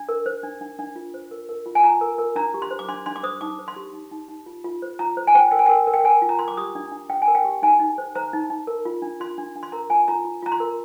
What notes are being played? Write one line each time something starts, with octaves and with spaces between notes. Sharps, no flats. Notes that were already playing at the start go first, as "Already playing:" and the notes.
Already playing: D4
A#4
C5
D4
D4
D4
F4
C5
A#4
A#4
F4
G#5
F4 A#5
A#4
A#4
D4 A#5
G4
C6
C5
D6
D4 C6
D4 C6
D6
C5 D#6
D#4 D6
C5
C6
G4
D#4
D#4
D#4
F4
F4
C5
F4 A#5
C5
G#5
C5 G5
A#4 G5
G#5
A#4 G5
A#4
G5
A#4 G#5
F4
A#5
A#4 C6
D6
G4 D#6
D4
D4
D4 G5
G#5
A#4
G5
G4
D#4 G#5
D#4
C5
C5 A#5
D#4
D#4
A#4
F4
D4
F4 C6
D4
D4
C6
A#4 A#5
F4 G#5
F4 A#5
F4
F4 A#5
C6
A#4